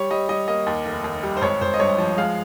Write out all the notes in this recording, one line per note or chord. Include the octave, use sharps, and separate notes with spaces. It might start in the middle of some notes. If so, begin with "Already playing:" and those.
Already playing: G3 C#5
G3 D#5
G3 D#5
A#3 D#5
D#2
F1
D#2
G3
C5
G#1 C#5
G#1 C5
D#5
G2 C#5
F3
G#3 F5